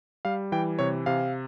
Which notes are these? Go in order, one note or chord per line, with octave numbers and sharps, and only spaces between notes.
G3 F5
E3 G5
C3 C#5
C3 F5